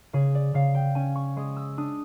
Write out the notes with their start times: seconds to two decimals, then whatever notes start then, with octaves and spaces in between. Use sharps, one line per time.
0.13 C#3 G#4
0.35 D5
0.54 C#3 F5
0.75 G5
0.95 C#4 G#5
1.15 C#6
1.36 G#3 D#6
1.56 E6
1.77 D4 D#6